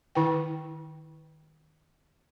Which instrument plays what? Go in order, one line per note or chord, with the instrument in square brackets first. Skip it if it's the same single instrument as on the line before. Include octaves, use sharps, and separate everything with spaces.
[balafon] D#3 E4 B4 G5